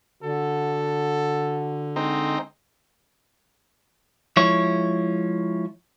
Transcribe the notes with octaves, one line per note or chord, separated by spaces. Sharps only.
D3 F#4 A4
G#3 C4 D#4
F3 G#3 E4 C#5